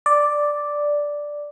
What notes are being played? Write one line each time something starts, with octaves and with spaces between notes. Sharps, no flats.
D5